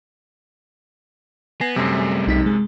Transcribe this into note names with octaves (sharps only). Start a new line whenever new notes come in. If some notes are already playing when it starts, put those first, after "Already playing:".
B3 G#5 A#6 C7
F#2 C3 G3 A3
B1 D#4 B6
G#3